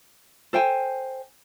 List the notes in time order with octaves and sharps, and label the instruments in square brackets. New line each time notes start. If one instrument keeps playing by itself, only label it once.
[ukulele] A4 C5 G5 G#5